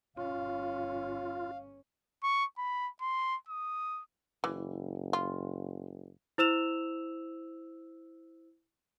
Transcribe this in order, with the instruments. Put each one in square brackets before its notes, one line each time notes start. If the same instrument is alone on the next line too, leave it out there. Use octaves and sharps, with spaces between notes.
[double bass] G1 C#4 [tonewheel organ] F4 [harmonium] F5
[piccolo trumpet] C#6
B5
C6
D#6
[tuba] F#1 [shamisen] E3
[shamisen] F4
[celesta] E4 C5 E6 E7 F7